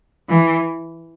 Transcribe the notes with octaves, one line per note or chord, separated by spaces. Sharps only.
E3